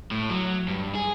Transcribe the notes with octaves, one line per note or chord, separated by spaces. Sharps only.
A2
F#3
G2
G#4